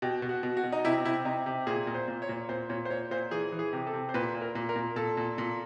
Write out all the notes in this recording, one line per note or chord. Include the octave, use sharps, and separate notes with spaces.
B2 G4
B2
F#4
B2
F#4
B2
D#4
C3 E4
C3 E4
C3 D#4
C3
A#2 G#4
A#2
C5
A#2
C#5
A#2
A#2 C5
A#2 C#5
C5
A#2 C#5
A#2 C5
E3 G#4
E3
G#4
C3
A4
C3
C5
A#2 B4
A#2
A#4
A#2
A#4
A#2
A#2 A4
A#2
A#2